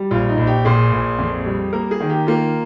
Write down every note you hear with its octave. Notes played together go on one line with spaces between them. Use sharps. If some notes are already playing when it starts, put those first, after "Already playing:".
Already playing: G3
A#1 F4
D#4
A#1
G4
A#2 G#4
A#1
F2
G3
A#3 A#4
G#4
D#3
G4
A#3 F4